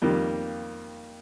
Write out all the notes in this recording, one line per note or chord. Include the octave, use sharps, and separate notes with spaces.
F2 D#3 G3 A#3 F4